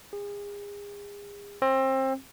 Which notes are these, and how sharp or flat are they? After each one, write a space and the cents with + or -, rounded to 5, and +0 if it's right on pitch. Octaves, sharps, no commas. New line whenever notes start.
G#4 -35
C4 +25